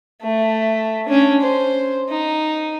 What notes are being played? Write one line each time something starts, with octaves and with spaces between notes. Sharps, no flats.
A3
C#4 D4
C5
D#4